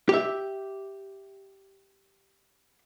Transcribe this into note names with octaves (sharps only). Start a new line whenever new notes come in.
G4 E5